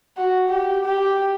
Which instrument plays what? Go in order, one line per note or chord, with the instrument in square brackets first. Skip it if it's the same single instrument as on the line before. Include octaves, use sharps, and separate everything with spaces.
[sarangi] F#4
G4
G4